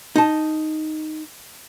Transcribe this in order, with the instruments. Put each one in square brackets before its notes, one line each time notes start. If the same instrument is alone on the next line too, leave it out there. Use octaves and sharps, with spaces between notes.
[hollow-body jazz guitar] D#4 A5